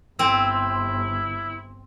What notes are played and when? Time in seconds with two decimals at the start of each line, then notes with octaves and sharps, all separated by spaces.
0.19 G1 C4 E4